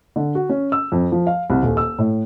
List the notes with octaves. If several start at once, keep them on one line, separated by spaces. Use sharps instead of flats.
D3
F#4
C#4
E6
F2
F3
F5
C2
D#1
E6
A2